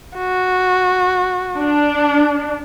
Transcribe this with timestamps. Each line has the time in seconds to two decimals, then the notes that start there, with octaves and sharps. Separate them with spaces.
0.17 F#4
1.57 D4